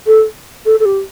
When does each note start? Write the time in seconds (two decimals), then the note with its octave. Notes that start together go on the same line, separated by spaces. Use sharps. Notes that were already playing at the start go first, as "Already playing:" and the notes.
0.06 A4
0.65 A4
0.80 A4
0.85 G4